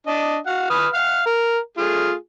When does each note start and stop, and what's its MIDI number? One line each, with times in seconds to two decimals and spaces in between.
0.07 0.38 62
0.07 0.38 75
0.47 0.67 66
0.47 0.67 77
0.47 0.67 78
0.70 0.87 71
0.70 0.87 87
0.70 0.87 89
0.94 1.21 77
0.94 1.21 78
0.94 1.21 89
1.26 1.58 70
1.77 2.14 57
1.77 2.14 65
1.77 2.14 68